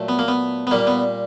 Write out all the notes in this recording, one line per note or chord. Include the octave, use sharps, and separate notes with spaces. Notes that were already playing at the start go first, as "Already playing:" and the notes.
Already playing: A#2 F#3 A3
B3
A#3
B3
B3
A#2 G3 A#3
B3